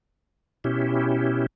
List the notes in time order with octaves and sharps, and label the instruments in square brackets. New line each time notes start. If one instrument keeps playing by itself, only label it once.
[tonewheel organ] B2 C#4 E4 G4